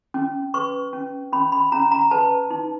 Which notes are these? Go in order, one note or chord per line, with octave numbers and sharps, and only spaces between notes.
C#4
B4 C#6
C#4
C#4 B5
B5
C#4 A#5
A#5
B4 A5
D#4